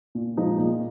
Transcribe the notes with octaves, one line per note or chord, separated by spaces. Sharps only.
A#2
F3 G#3 D#4
A#2